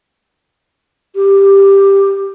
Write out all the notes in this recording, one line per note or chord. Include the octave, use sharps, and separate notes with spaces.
G4